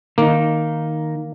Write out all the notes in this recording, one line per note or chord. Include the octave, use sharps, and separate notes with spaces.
D#3 A#3 D#4